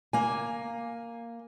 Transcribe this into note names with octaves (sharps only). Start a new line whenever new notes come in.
A#3 G#5